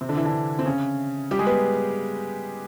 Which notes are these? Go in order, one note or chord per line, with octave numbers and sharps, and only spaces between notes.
C3 C4
D3 D4
E3 E4
D3 D4
C4
C#3 C#4
G3 G4
G#3 G#4
B3 B4